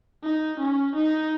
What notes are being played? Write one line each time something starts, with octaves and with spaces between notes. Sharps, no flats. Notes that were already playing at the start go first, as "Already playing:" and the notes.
D#4
C#4
D#4